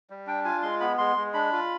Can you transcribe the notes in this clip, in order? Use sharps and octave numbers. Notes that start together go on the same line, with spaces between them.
G3
D4 G5
F4 G#5
G#3 C6
B3 B5
G#3 C6
G#3
D4 B5
F4